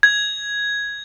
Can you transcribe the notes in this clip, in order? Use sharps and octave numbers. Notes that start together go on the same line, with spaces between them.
G#6